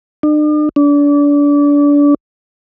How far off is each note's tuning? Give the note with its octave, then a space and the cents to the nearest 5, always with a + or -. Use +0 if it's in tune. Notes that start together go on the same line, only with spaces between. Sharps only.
D4 +45
D4 -30